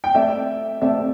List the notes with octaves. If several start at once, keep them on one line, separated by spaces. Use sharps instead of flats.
G5
A3 C4 A4 D5 E5 G5
A3 C4 A4 D5 E5 G5